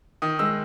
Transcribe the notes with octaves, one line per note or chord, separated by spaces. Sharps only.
D#3 D#6
G#3 E6